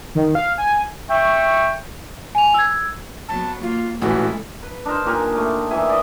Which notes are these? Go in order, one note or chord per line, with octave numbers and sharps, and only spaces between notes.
D#3
F5
G#5
E5 G5 C#6
G#5 F7
E6 G#6
F#3 B3 A5
A#3 F4
A1 A#2 E3 G#3 A3 E4 F#4
B4
D4 D#4 A#4 C5
A#2 G4 A#4 G#5
A3
D#3 E3 E5 G#5
D5 D#5